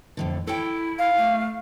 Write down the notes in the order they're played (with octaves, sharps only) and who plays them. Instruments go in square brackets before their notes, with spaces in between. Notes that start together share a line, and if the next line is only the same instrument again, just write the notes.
[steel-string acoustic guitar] F2 A2 D3
[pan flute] E4 [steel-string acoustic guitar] A4 C#5 G5
[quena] F5
[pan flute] A3